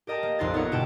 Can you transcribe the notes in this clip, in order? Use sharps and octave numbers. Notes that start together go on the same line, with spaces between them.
G4 A#4 D#5 G5 A5
A#3
A#1 F2 D#4 C6 F#6 A6
B3 D#4 A#4 C#5 F#5
G1 B2 E4 G4 G5 A5